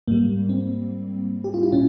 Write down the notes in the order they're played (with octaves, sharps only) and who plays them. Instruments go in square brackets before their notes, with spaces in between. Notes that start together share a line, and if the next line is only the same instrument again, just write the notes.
[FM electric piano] G#2 G3 A#3
C4
G4
F4
E4
A#2 C#4